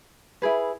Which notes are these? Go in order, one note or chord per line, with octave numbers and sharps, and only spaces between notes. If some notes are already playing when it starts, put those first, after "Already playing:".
E4 G#4 B4